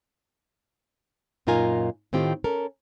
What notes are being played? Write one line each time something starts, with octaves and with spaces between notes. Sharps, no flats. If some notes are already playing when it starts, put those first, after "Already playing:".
F#2 A#2 D#4 F4 A#4 G#5
A2 D#3 C4 F4 G4
C#4 A4 A#4